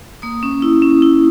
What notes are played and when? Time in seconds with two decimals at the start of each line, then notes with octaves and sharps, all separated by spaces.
0.22 A#3 D#6
0.43 C#4
0.62 E4
0.82 C#4
1.02 E4